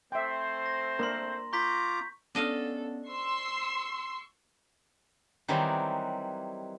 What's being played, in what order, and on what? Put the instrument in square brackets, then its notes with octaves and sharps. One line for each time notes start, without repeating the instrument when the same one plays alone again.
[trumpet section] A3 C4 C5 [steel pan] E5 G5
[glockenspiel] A#6
[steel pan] A#3 D4 A#4 [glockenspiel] A#5 C6
[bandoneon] F4 A#5 D6 [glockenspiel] C#6 G6 B6
[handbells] B3 C#4 C#5 [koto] D4 D#5 F5 [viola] A4
[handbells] C5 [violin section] C6 E6 C7 [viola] C#6
[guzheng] D#3 E3 F#3 G3 C4